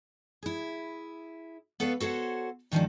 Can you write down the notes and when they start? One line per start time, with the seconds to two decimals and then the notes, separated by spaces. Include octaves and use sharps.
0.43 E4 G#4
1.80 B3 A4 B4 C#5 D5 F5
2.00 F#4 A4 C5 C#5 F#5
2.71 G2 D#3 F3 G#3 C#4 D4